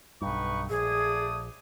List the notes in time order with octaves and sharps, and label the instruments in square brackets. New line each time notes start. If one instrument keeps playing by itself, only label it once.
[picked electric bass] B1 G2 [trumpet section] D#4 B4 C#6
[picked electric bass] A#1 [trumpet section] A3 D5 D#6 [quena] G#4